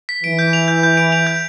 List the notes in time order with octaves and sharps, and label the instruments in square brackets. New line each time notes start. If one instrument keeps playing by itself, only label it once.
[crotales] B6
[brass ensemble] E3 [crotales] D7
[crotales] G6
F7
G6
G6
D7
F7
G6